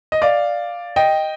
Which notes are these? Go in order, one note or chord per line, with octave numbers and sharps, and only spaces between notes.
D#5
D5 F5
D#5 G5